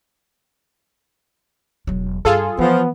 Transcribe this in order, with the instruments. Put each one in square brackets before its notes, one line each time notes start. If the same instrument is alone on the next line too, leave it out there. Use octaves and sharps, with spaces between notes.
[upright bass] E1 F#3
[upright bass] G2 [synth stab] F4 G#4 A4
[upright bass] E3 [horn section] F3 [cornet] B3